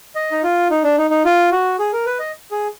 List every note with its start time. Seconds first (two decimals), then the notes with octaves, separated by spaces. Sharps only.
0.16 D#5
0.32 D#4
0.43 F4
0.70 D#4
0.84 D4
0.98 D#4
1.11 D#4
1.25 F4
1.52 F#4
1.79 G#4
1.93 A#4
2.06 B4
2.19 D#5
2.51 G#4